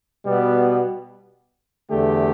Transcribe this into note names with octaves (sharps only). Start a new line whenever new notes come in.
B2 G3 B3
E2 D3 A3 G4